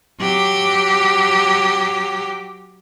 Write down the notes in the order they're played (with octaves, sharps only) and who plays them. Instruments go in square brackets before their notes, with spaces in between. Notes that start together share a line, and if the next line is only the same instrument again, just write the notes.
[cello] F#3 G4